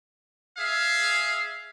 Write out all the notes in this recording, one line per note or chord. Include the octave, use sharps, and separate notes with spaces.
G#4 E5 F5